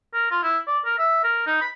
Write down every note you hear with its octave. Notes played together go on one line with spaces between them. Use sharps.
A#4
F4
E4
D5
A#4
E5
A#4
D#4
B5